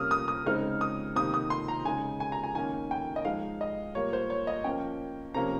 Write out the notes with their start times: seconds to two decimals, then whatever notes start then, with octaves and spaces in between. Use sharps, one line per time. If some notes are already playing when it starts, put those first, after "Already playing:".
Already playing: C3 G3 A#3 C#4 D#6 F6
0.11 D#6
0.28 D#6
0.46 C#3 G#3 C4 D#4 F6
0.81 D#6
1.16 C3 D#3 A#3 D#6
1.34 D#6
1.50 C6
1.68 A#5
1.85 C#3 G#3 D#4 G#5
2.20 G#5
2.32 A#5
2.43 G#5
2.55 D#3 A#3 C#4 G#5
2.91 G5
3.16 D#5
3.25 F3 G#3 D#4 F5
3.61 D#5
3.95 A#2 G3 A#3 C#5
4.13 C5
4.30 C#5
4.47 D#5
4.64 F3 A#3 C#4 G5
5.34 C3 F3 A#3 C#4 A#5